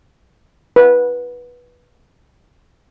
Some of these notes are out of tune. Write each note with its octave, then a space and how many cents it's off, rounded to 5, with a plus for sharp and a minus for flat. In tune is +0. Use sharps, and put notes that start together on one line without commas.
B4 -15